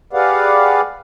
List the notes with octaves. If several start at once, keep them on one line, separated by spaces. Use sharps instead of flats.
G4 G#4 B4 D5 F5 F#5